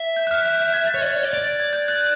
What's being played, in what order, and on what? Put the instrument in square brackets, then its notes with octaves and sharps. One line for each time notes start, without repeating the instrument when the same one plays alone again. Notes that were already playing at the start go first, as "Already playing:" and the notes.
Already playing: [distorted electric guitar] E5
[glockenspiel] G6
F#6
F6
G6
G6
G#6
A6
[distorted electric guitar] C#5
D5
C#5
D5
D5
[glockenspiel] A6
G#6
G6
F#6